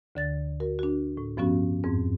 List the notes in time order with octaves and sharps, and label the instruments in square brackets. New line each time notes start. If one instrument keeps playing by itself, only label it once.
[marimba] D2 D3 A6
F#4 A#4
D4 F#4
A2
G2 F3 B3 C#4 F#4
F2 G#2 C4